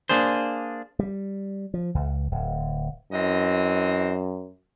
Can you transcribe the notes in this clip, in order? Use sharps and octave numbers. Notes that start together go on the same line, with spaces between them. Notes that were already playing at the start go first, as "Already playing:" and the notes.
A#3 D4 G#4 C5
G3
F3
C#2
D1
F#2 E3 C4 D#5